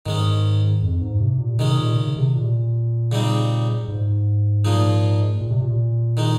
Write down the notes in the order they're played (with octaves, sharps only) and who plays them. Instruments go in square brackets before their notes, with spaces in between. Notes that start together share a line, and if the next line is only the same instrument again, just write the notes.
[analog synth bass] G#2 [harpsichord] D#3 G#3 C#4
[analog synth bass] F2
G#2
C3
A#2
[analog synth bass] C3 [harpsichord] D#3 G#3 C#4
[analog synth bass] A#2
C#3
C3
A#2
[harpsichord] C#3 G3 C4 D#4
[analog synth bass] G#2
[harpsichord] A#2 F3 G#3 D#4
[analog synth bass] A#2
C3
A#2
[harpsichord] D#3 G#3 D#4